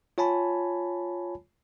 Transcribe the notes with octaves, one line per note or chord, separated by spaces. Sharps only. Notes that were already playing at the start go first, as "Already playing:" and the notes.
F4 C#5 G#5 A5 B5